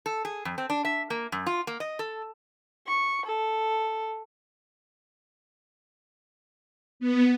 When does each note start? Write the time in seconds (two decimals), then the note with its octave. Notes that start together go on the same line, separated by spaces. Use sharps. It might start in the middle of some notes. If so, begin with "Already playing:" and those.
0.06 A4
0.25 G#4
0.45 F2
0.58 C4
0.70 D4
0.85 E5
1.10 A#3
1.32 F#2
1.46 F4
1.67 A#3
1.80 D#5
1.99 A4
2.87 C#6
3.25 A4
7.00 B3